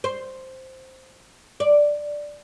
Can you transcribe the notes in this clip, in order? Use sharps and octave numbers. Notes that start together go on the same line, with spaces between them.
C5
D5